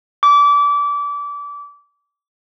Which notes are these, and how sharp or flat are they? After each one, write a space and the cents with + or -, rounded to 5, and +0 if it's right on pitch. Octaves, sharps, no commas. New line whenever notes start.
D6 -25